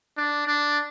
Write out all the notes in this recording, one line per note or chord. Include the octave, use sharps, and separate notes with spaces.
D4
D4